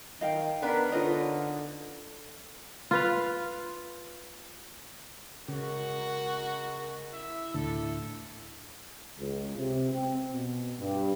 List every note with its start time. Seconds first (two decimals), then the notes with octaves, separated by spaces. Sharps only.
0.21 D#3 D#5 F5 G5
0.62 B3 D4 A#4 B4
0.92 D3 C#4 D#4 F4 D#5
2.91 F4 B4 F5
5.48 C#3 G#3 F#4 A#4
7.13 E4 E5
7.54 D2 A2 D3 A4
9.18 C#2
9.56 C3
9.92 C4
10.32 B2
10.78 G2